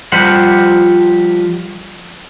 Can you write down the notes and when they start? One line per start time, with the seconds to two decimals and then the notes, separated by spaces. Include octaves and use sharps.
0.12 F3 G3 F4 G4 C5 F#5